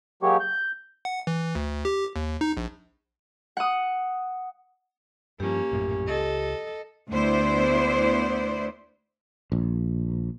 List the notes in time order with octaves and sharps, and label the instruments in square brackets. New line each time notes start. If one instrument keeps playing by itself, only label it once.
[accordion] F#3 G#3 A#3 G4 C#5
G6
[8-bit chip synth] F#5
E3
D2
G4
D#2
D#4
A#1
[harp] F#5 D#6
[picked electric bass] G2 F3 [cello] A#3 C#4 [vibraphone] G4
[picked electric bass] A#1 F#2 A2
[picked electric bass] C#2 [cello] A4 D#5
[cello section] D2 B3 E4 C5 D5
[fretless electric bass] A#1